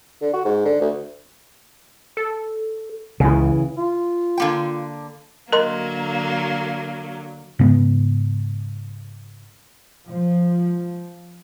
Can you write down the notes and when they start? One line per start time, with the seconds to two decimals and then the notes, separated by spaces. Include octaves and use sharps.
0.22 D3
0.33 F#4
0.45 G#2
0.65 D3
0.81 D2
2.17 A4
3.20 C#2 C#3 E3
3.77 F4
4.38 D3 A#3 G5
5.52 D3 F#3 A#3 A#4 D#5 C6
7.59 G#2 C#3 B3
10.08 F3